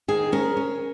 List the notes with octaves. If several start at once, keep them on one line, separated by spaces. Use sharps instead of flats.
D#3 G#4
C#4 A#4
C#4